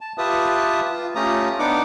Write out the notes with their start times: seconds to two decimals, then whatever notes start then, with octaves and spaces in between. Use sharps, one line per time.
0.01 A5
0.18 F4 G4 B4 E5 A5 D#6
0.92 F4
1.15 A3 C#4 F4 G4 A#5 D#6
1.59 B3 D4 D#4 F#5 D6